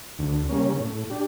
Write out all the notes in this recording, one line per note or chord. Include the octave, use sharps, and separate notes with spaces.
D2
C#3 G3 A#3 C#4
A2
D4 G4